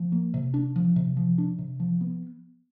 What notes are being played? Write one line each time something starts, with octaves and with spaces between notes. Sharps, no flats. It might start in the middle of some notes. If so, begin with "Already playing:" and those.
Already playing: F3
A#3
C3
D4
F3
C3
F3
D4
C3
F3
B3